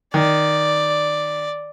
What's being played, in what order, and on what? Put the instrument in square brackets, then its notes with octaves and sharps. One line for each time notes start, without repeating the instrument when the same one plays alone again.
[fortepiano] D#3 [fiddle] D5